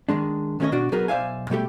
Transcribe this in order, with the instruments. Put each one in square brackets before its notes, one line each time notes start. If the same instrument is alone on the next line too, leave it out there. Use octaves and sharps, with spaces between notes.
[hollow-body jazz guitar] D#3 G#3 D4
D#3 A3 C#4 G#4 C#5 D#5
B2 D4 F#4 D5
F#3 B3 D#4 F#4 G#4 A#4
B1 C5 D5 E5 F5 G#5
B2 G3 A3 G4